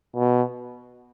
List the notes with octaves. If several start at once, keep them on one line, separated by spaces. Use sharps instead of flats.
B2